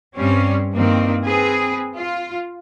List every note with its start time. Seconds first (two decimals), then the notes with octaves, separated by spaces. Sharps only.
0.16 G2 G3 C4 C#4
0.75 G2 D#3 A#3 C4
1.26 C4 G#4 B4
1.96 F4